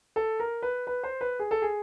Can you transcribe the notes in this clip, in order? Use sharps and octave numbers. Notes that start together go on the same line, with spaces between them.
A4
A#4
B4
B4
C5
B4
G#4
A4
G#4